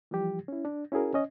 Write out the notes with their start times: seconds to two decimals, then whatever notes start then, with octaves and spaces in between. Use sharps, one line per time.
0.11 E3 F3 G3 G4
0.48 C#4 E4
0.65 D4
0.92 C#4 E4 F#4 G#4 A#4
1.14 C#4 D#5